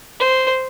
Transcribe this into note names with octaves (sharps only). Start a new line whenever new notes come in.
C5